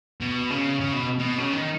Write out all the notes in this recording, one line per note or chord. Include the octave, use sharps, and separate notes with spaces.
B2
C#3
C#3
B2
B2
C#3
D#3